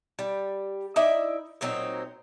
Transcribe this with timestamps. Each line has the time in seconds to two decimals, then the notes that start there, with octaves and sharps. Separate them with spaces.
0.19 G3
0.96 D#4 E4 D5 E5
1.61 A#2 F#3 C4 D#4